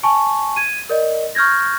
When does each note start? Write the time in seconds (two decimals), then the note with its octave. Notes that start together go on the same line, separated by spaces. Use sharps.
0.03 G#5 A5 C#6
0.56 G#6 D#7
0.89 A#4 D5 D#5
1.35 C#6 F6 G6 G#6 A#6